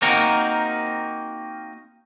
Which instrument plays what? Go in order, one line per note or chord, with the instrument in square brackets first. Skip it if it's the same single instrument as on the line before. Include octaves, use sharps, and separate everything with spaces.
[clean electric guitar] A#3 C4 D#4 F#4 A#4